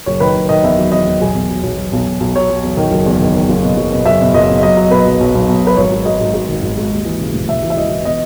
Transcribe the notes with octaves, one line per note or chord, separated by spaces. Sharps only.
F#1 C#5
D#3 B4
F#1
D#3 D#5
E2 E5
F#3
E2 D#5
E2
B1 G#4
B1
F#3
B1
F#3
B1
B1
B1
F#3 C#5
F#3
E2
D#3
F#1
E2
D#3
D#3
F#1
B2
F#1
B2
F#1 E5
B2
F#1 D#5
B2
F#3 D#5
F#3
B2 B4
B1
B1
B1
B1
F#3 B4
G#1 C#5
F#3
G#2 D#5
G#2
G#2
D#3
G#1
G#2
D#2
E3
C#3
E1
E1 E5
E3
E5
E3 D#5
E3
B2 D#5